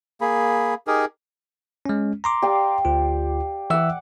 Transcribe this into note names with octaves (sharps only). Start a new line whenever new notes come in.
A#3 G#4 B5
D#4 G4 G#4 A#4
G#3 C#4
A#5 C6 D6
G4 D5 F5
D2 F4
E3 E5 F#5 D6 E6